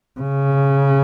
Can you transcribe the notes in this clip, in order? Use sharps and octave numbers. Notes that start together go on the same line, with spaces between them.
C#3